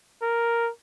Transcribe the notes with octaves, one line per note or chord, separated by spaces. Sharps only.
A#4